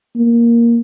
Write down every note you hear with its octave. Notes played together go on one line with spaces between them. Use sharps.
A#3